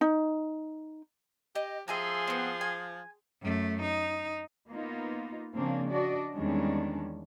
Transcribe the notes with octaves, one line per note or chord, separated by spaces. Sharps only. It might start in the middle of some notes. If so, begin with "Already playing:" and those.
D#4
G4 D#5
F3 G#4 E5 G#5 A#5 C6
B3 C4
G#5
F#2 A3
D#4
A#3 B3 D#4 F4
C#3 F3 A#3 C4 D4
D4 F#4 D5 D#5
E2 D#3 G3 G#3 C#4 D4